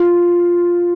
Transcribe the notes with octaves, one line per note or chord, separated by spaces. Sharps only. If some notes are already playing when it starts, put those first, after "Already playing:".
Already playing: F4